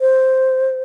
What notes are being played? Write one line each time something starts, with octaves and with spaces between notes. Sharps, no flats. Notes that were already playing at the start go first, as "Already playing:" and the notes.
C5